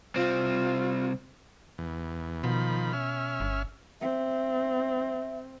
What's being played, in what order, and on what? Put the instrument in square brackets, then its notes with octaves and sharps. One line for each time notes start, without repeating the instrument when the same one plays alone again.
[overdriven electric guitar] C2 C4 [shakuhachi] F4
[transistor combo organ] E2
[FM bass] B2 [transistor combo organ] D#3 F3 B5
[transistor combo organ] C#4 E5 F6
[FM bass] G1
[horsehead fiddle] C4 [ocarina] E5